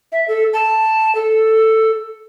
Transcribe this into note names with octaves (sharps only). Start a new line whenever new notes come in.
E5
A4
A5
A4